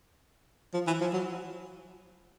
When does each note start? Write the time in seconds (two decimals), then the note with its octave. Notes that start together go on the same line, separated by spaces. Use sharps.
0.74 F3
0.87 E3
1.00 F3
1.13 F#3